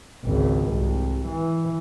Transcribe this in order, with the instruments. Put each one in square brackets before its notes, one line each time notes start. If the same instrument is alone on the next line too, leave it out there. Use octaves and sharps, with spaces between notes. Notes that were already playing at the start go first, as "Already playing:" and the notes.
[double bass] G#1 C#2
C2
E3